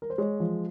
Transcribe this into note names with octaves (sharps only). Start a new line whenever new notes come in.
A#4
C5
G#3 C#5
F3